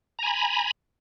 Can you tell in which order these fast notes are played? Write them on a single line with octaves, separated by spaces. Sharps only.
A#5 G#5 B5